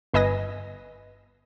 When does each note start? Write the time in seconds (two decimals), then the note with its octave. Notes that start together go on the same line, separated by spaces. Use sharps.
0.14 G1 B4 D#5 G#5 D#6 A#6